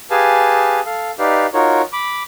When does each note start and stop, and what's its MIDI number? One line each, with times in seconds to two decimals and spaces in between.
0.11 0.81 67
0.11 0.81 68
0.11 0.81 71
0.11 0.81 77
0.11 0.81 80
0.11 0.81 81
0.86 1.11 69
0.86 1.11 77
1.19 1.47 63
1.19 1.47 67
1.19 1.47 71
1.19 1.47 74
1.19 1.47 77
1.54 1.82 63
1.54 1.82 65
1.54 1.82 66
1.54 1.82 70
1.54 1.82 73
1.93 2.23 83
1.93 2.23 86